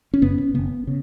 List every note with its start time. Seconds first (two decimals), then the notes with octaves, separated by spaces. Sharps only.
0.14 C#4
0.22 F#1 F#2 C#3 B3
0.38 C#4
0.54 F#1 F#2 C#3 B3
0.87 C#3